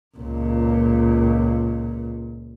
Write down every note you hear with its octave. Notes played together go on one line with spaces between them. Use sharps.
C#2 A#2